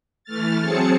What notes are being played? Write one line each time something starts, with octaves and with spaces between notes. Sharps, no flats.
E3 A3 F6 A6
F#3 C4 G#4 A5 C#7